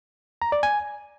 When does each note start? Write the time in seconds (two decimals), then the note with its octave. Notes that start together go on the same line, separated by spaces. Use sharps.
0.42 A#5
0.52 D5
0.63 G#5